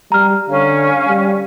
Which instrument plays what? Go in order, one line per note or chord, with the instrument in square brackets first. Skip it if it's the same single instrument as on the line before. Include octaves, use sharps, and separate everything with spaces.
[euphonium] G3 [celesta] A#5 F6
[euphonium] D3 [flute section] C#4 F5
[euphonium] G3